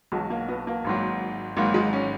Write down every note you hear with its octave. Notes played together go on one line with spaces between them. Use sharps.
B1 B2 F#3 G#3
A#3
B3
A#3
G#1 G#2 F#3
G#1 G#2 F#3 A#3
G#3
C#4